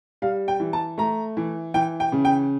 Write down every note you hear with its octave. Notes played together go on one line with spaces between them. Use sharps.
G3 F5
G5
E3
A5
A3 A#5
E3
E3 G5
G5
C#3
G5